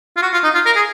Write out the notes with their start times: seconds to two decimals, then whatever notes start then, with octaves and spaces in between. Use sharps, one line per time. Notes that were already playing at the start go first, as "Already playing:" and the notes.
0.17 F4
0.22 F#4
0.33 F4
0.44 D#4
0.55 F4
0.66 A#4
0.76 G#4